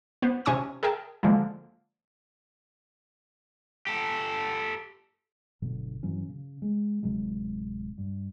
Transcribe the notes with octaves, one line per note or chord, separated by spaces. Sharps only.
B3 C5
C3 C#4 G#5 C#6 D#6 E7
G#4 A#4 E5 G5 A5
D3 F3 G#3 A#3
G4 A4
G1 B2 D3 F#3
G2 E3 F#3 C#4
C#3
G#3
D1 C3 F#3 G#3
G2